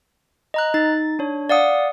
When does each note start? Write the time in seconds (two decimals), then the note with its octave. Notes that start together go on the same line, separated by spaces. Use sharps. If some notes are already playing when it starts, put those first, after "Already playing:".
0.54 D#5 A#5 F#6
0.74 D#4 A6
1.19 D4 C#5
1.49 D5 F5 F#5 D#6